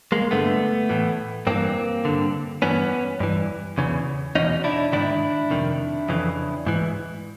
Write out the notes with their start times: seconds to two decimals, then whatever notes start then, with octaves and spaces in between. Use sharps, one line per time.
0.12 G#3 A#3
0.31 G2 D3 A3 B3
0.89 A2 E3
1.47 G2 E3 A#3 C4
2.05 G2 D3
2.62 G2 E3 B3 C#4
3.20 G2 E3
3.78 E2 C#3 E3
4.35 E2 B2 C#4 D#4
4.64 D4 E4
4.93 G#2 D#3 D4 E4
5.50 F2 C3 D#3
6.09 F2 C#3 E3
6.66 G#2 E3